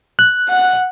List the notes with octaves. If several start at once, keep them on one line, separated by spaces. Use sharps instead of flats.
F#6
F#5